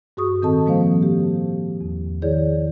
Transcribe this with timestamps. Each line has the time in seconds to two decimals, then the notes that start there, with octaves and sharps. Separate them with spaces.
0.17 G2 F#4 G#4 C#6 D#6
0.42 A2 D#3 C4 A4 D#5 A5
0.66 F3 G3 A#3 C5 F5
1.03 G4
1.81 E2
2.22 D#3 E4 G#4 C#5 D5